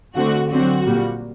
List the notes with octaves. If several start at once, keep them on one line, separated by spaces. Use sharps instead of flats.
D3 A3 C4 F#4
D3 F#3 C4 F#4
A#2 G3 A#3